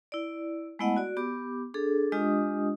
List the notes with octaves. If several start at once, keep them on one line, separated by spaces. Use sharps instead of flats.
E4 D5
G#3 A3 B3 E4 D#5 F#5
F#4 D5
B3 G4 D6
D4 G#4 A4
G#3 D4 F4 G4 D#5 D#6